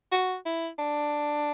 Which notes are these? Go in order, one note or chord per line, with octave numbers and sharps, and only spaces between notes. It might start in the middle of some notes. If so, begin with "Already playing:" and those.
F#4
E4
D4